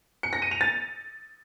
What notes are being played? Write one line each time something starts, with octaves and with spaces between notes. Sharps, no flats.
C#7
A#6
D#7
F7
A6